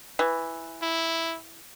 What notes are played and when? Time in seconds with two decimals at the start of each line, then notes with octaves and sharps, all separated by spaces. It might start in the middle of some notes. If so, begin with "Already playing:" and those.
0.19 E3
0.82 E4